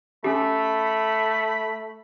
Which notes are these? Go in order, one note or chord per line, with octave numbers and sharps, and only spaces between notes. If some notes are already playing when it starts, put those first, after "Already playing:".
A3 C#4 G4 B5